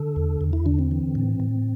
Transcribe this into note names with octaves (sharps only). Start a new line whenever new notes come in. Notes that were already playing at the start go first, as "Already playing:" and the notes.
Already playing: D3 A4
E2
E2
E4
D3 D4
C4
E3
A2
A2